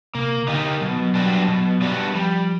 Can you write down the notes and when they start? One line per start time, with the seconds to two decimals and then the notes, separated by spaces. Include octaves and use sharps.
0.15 C3 A#3
0.42 C#3
0.48 D3 D#4 G4 A#4
0.81 B2 F#3
0.97 F#3
1.15 G3 B3 D4 F#4
1.48 B2
1.82 G3 B3 D4 F#4
2.14 F3 G3